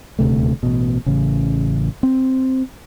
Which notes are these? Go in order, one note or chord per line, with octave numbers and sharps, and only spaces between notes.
D#1 D2 C3 A3
A1 B2
A1 C#3
C4